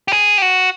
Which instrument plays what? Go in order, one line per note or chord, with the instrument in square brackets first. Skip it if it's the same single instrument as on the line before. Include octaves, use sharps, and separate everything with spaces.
[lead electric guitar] G4
G#4
G4
F#4